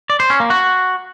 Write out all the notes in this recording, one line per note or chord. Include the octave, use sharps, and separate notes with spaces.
D5
C5
C#4
A#3
F#4